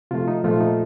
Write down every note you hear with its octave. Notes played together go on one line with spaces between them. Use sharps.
C3 F3 A3 F4
D#4
A#2 F3 A3 F4
D#4